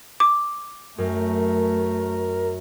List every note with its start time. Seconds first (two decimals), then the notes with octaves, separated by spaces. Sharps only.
0.20 D6
0.98 F#2 A3 A#4